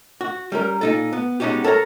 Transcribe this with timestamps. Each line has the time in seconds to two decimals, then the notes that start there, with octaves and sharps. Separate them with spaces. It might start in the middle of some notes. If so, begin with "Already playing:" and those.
0.21 F#4
0.52 G3 C#4 A#4
0.81 A#2 D#4 A4
1.13 B3
1.40 G#3 B3 C#4 D#4 F#4 G4
1.64 A4 A#4 C#5 A#5